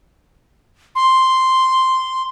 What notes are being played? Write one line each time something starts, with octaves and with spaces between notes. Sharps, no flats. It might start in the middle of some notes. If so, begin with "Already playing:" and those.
C6